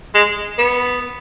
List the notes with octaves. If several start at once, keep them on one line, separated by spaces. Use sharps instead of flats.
G#3
B3